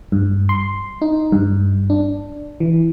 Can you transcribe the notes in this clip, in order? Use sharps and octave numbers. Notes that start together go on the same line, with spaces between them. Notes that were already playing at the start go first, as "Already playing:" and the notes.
G2
C6
D#4
G2
D4
E3